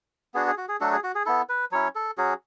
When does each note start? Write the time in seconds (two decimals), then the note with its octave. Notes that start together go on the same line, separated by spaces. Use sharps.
0.34 B3 D4 F#4 G#4
0.47 G#4
0.58 F#4
0.68 G#4
0.80 F#3 A3 D4 F#4 A4
0.92 G#4
1.04 F#4
1.15 G#4
1.26 B3 E4 A4
1.49 B4
1.71 F#3 C#4 E4 C#5
1.95 A4
2.18 F#3 C#4 F#4 G#4